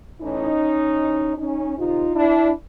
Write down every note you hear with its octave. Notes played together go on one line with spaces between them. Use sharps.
A2 E3 C#4 D#4
C3 E3
C#4 D#4
C3 D#3 D#4 F4
D4 E4